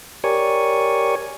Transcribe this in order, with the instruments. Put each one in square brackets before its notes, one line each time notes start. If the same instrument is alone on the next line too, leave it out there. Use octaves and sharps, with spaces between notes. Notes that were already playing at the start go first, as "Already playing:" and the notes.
[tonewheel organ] G4 A#4 C#5 D5 G#5 C#6